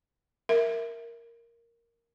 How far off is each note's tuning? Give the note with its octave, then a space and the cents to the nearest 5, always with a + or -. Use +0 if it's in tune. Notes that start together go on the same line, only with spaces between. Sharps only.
A#4 +0 E5 +0